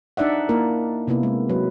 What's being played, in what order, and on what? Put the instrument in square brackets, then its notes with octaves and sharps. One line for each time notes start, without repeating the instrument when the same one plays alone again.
[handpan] D4 D#4 D5 E5 F#5
A#3 E4 A#4
C3 A#3 B3 E4
G#3
F#3 B4